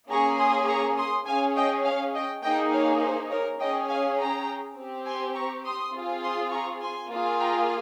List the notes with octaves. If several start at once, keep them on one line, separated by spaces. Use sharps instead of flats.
A#3 C#4 G#4 A#5 C#6
C6 D#6
A#5 C#6
C6 D#6
C#4 G#4 F5 G#5
D#5 G5
C#5 F5
D#5 G5
A#3 D#4 G#4 D#5 G5
C#5 F5
C5
A#4 C#5
C#4 G#4 D#5 G5
F5 G#5
G5 A#5
C4 G4
G#5 C6
A#5 C#6
C6 D#6
C4 F4 G#4
C6 D#6
A#5 C#6
G#5 C6
A#3 F4 G#4
G5 A#5